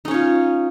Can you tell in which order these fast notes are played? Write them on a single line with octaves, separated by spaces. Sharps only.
D#4 C#4 C#5 F4